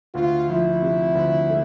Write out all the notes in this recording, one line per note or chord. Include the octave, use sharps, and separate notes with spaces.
D2 F4
F3 E4
C3
D2
A3